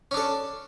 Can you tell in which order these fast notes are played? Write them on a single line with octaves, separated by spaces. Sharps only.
C#4 D4 A4